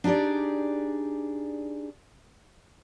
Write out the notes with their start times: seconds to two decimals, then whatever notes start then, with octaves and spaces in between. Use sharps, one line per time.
0.04 D4 D#4 G4 G#4 D5